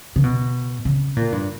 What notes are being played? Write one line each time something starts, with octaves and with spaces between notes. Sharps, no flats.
C#3
B2
C#3
A#2
G2